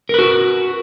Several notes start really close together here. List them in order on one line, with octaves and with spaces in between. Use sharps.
A#4 B4 F#4